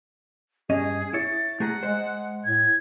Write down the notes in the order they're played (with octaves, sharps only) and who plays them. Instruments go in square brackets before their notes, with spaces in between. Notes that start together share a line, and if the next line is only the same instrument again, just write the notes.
[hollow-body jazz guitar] G2 C#4 D#5 [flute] G#4
[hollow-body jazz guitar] E4 C#5 [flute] A6
[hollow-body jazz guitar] A3 G#4 A#5 [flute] F#5
[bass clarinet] G#3 [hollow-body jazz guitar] C5
[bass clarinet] A2 [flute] G#6